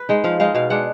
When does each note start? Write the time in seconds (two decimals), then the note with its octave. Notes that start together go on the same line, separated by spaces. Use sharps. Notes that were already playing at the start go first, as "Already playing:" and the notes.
Already playing: B4
0.09 G#3 D#4
0.24 F3 F5
0.40 G#3 D#4 F5
0.55 B2 F5
0.70 G#3 D4 F#5